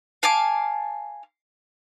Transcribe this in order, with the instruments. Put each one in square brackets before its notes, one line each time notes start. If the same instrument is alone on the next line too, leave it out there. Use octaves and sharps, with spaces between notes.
[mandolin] F5 G#5 A5 D6